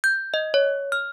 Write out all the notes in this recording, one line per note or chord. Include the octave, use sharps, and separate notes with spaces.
G6
D#5
C#5
F6